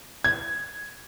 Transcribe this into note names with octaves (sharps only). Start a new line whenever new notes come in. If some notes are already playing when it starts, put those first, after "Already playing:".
G#6